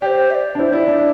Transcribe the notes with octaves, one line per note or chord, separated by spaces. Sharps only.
G4 C5 D5
E5
D5
D4
E4 C5
E4 D5
D4